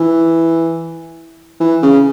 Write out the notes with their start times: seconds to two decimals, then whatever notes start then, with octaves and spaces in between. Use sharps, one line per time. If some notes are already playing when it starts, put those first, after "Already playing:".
Already playing: E3
1.60 E3
1.83 C#3